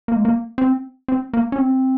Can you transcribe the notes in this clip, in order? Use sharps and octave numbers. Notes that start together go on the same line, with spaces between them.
A#3
G#3
A#3
C4
C4
A#3
C#4
C4